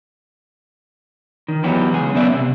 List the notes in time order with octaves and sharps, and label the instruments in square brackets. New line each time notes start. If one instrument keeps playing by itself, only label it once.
[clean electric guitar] D#3
E3 F#3 B3 G4
C#2 G#4
F#2 C#3 B3 D5 E5 F#5
C3